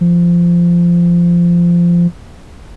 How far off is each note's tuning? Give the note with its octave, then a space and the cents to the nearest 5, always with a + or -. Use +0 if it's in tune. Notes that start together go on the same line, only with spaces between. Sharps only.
F3 -15